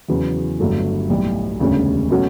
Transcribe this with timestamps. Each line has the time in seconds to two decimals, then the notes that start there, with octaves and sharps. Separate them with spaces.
0.09 E2 C#3 F#3 B3
0.60 G1 G2 F#3 A3
1.09 B1 A2 G3
1.60 E1 D2 C#3 G3 C#4
2.10 B2 F#3 A3 C#4 F#4